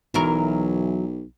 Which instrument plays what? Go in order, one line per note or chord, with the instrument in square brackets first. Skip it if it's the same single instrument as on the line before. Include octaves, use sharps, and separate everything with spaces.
[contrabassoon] B1 [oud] E3 F#3 A#4